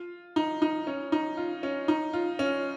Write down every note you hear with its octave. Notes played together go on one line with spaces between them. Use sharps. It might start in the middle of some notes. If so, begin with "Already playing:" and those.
Already playing: F4
D#4
D#4
C#4
D#4
F4
C#4
D#4
F4
C#4